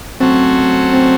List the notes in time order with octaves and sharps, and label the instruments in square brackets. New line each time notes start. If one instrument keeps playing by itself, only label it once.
[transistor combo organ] F#3 A3 C#4 F#4 C5 [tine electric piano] C4
[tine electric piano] C4